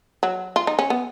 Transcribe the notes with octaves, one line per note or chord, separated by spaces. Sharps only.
F#3
F4
D#4
C#4
B3